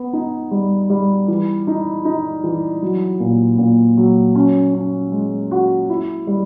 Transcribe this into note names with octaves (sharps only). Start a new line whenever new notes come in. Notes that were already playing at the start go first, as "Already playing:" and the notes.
Already playing: B3
D#4
G3
G3
E3
D#4
D#4
E3
F#3
A#2
A#2
F#3
C#4
C#4
G#3
F#4
E4
G3